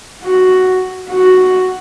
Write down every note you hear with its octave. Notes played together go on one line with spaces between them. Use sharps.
F#4
F#4